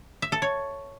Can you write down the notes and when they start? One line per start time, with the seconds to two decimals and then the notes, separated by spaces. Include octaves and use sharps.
0.22 E5
0.32 A4
0.42 C#5